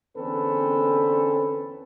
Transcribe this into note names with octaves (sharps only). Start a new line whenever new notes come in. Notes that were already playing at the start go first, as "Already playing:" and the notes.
E2 D3 C4 C#4 A4 B4